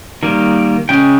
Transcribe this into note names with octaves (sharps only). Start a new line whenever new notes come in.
D#3 G3 A#3
C#3 G#3 C#4 G5